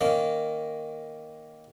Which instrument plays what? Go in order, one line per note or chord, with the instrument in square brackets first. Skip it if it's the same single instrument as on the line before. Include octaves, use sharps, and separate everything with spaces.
[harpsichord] D#3 A#3 C#4